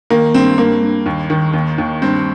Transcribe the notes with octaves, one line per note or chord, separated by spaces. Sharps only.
D#3 A#3
G2 C4
G2 A#3
G2
D#2
D#3
D#2
D#2
G2 C4